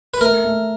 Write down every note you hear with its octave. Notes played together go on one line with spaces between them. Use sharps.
B4
A3 A#4
A3